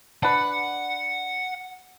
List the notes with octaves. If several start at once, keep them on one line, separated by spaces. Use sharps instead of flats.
D4 B4 F#5